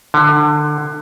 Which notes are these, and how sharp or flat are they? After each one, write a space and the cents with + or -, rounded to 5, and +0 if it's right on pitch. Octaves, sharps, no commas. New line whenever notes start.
D3 +25